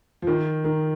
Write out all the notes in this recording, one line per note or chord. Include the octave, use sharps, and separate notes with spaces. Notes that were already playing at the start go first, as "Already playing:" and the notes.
F3
D#3
D#3